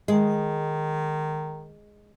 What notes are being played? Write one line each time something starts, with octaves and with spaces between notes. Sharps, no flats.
D#3 G#3